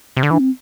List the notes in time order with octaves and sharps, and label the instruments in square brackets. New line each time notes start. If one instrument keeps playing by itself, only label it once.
[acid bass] C3
D3
[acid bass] E3 [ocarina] D4
[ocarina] C4